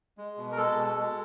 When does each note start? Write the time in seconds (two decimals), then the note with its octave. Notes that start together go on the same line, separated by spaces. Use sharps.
0.18 G#3
0.38 B2
0.52 A#4
0.57 G#3 A4
0.77 B2
0.97 G#3